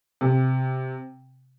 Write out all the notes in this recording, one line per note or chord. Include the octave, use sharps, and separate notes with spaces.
C3